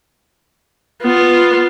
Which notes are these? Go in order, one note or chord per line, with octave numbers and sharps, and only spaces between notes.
B3 F4